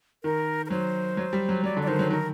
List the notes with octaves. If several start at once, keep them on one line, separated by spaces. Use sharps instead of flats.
D#3 A#4
A#4
F#3 C5
F#3
G3
F#3
F#3 D5
D3
D5
D#3 C5
F#3
D#3 A#4